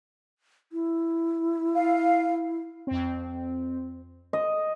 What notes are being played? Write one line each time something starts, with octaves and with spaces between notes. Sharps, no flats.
E4
F5
F2 C4
D#5